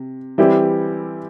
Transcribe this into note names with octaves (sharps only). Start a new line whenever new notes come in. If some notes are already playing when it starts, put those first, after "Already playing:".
Already playing: C3
E3 G3 C4 E4 G4